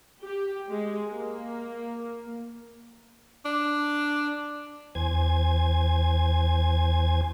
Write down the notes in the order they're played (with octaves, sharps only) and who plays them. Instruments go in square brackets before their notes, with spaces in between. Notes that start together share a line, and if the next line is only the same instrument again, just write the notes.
[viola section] G4
G#3
A#3
[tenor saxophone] D4
[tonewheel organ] E2 C5 G#5 G#6